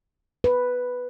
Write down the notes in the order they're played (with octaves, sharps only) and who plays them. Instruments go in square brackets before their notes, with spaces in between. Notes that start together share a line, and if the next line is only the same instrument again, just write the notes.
[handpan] B4